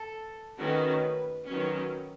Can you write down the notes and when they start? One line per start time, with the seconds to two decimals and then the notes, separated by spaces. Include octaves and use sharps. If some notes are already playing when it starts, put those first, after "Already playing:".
Already playing: A4
0.58 D#3 A3 C#4 F#4 B4
1.48 D#3 F#3 C#4 B4